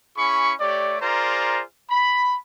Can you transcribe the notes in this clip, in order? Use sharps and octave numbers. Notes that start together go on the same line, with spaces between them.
C#4 E4 G#4 B5 C#6
A3 G4 C#5 D5
F4 G#4 A#4 C5 D5 A#5
B5